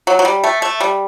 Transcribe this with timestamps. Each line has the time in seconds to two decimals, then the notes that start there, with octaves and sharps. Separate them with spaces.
0.07 F#3
0.19 F#3
0.25 G3
0.44 A3
0.62 A3
0.80 G3